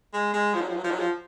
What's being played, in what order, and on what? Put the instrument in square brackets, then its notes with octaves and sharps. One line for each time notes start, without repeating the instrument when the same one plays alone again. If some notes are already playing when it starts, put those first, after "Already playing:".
[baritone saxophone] G#3
G#3
F3
F#3
F3
F#3
F3
F#3
F3